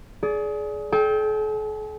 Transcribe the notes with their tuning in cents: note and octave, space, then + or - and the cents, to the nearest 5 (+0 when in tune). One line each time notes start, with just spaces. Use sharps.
G#4 +25 D5 -20
A4 -45 G5 +0